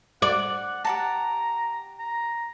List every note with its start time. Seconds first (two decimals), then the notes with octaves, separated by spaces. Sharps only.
0.22 D5 F#5
0.85 G4 F#5 A5 A#5
1.99 A#5